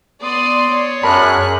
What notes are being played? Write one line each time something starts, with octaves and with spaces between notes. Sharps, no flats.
B3 D5 C6 D#6
C#5
F#2 G#4 A#4 A5 B5 F#6